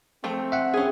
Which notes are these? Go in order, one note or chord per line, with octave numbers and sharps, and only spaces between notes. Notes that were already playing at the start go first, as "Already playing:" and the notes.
F3 A3 C4
E5 F#5
C#4 G#4